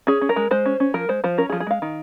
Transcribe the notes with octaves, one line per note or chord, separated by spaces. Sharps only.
C#4 G#4
C#4
A#4
G#3
G#3 C5
C#4
C#4
F3 A#4
G#3 C5
F3 C5
C#4 A#4
G#4
F3
G#4
G#3 F5
D#3